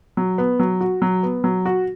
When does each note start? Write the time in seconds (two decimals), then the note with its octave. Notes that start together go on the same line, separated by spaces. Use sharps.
0.17 F#3
0.38 B3
0.59 F#3
0.81 F#4
1.02 F#3
1.23 B3
1.44 F#3
1.66 F#4